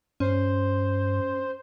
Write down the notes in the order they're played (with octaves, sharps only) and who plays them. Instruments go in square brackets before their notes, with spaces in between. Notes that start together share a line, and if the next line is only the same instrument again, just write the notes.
[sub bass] G2 [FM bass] C#4 [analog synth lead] C5